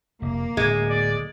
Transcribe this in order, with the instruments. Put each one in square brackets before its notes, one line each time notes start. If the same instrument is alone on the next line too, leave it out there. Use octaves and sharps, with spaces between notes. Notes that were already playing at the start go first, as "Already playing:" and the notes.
[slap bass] F1 [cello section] A#3
[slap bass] D1 [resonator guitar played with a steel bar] G#3
[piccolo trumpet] D5